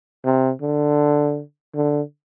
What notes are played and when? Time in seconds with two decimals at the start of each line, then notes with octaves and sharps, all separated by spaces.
0.24 C3
0.62 D3
1.75 D3